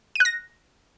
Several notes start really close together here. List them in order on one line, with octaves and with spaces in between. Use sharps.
D#7 F#6 A#6